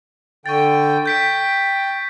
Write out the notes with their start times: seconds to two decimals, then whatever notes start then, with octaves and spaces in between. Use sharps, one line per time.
0.46 D3 G5 C#6 A6
1.06 G5 G6 B6 D7